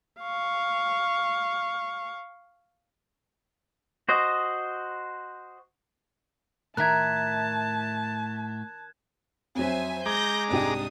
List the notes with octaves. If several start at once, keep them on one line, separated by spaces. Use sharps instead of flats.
F5 C#6
F#4 C5 D#5
A2 D#3 A#4 E5 A5 F#6 G#6
F2 F#3 C5 E5 G#5
G#3 A#5 D6 G6 G#6 A#6
C2 G#2 D4 D#4 G4 D#6